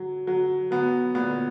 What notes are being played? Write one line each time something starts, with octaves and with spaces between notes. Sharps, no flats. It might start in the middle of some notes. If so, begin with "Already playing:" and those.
Already playing: F#3
F#3
F#3 B3
A#2 B3